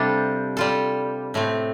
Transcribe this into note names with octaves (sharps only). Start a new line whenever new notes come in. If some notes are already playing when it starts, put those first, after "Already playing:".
Already playing: C3 G3 D4 F4 A4
G3 F4 A4
A2 A3 C4